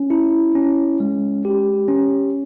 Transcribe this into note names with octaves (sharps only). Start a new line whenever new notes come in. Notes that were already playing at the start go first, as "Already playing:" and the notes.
Already playing: C#4
E4
C#4
G#3
G4
C#4